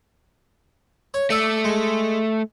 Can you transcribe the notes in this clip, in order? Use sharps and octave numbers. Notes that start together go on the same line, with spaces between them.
C#5
A3 D5 E5
G#3